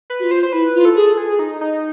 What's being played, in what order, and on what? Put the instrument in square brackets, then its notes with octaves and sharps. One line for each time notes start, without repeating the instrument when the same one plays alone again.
[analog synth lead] B4
[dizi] F#4
F4
[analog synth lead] C5
C5
[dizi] E4 [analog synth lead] B4
[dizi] F4
[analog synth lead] A4
[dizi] G#4
[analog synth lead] G#4
D#4
D#4